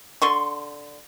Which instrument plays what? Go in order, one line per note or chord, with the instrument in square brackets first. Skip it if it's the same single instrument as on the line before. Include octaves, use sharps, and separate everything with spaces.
[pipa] D3 C6 C#6